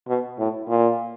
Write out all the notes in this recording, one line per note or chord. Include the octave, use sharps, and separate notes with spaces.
B2
A2
A#2